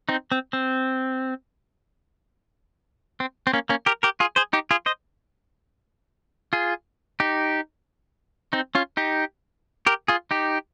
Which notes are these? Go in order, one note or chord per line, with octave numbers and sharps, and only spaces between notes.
C4 D#4
C4
C4
C4
C4
A#3 C#4
A#3 C#4
G4 A#4
G4 A#4
F4 G#4
G#4 C5
D#4 G4
F4 G#4
C5 D#5
F4 G#4
D#4 G4
C4 D#4
C#4 F4
D#4 G4
G4 A#4
F4 G#4
D#4 G4